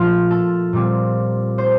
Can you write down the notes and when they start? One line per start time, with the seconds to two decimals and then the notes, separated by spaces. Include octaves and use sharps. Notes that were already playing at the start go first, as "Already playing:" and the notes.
Already playing: A#2 F3 A3 F4
0.31 A4
0.73 A#2 G3 C4
1.58 C5